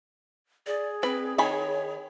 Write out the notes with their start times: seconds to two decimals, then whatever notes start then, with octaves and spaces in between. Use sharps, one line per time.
0.67 G#4 D5
1.03 C4 B4
1.38 D#3 C#5 G#5 B5